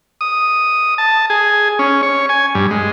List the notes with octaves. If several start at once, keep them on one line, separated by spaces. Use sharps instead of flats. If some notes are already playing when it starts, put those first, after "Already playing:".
D#6
A5
G#4
C#4
C#5
G#5
G2
G#3